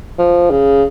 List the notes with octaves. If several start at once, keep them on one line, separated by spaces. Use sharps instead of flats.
F3
C#3